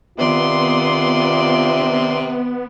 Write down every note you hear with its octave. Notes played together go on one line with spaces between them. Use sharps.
C3 D#3 B3 F4 D5 C6